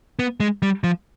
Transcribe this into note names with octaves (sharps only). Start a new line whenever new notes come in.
B3
G#3
G3
F3